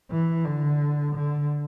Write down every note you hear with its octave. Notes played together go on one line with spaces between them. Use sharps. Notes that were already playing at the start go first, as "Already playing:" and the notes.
E3
D3
D3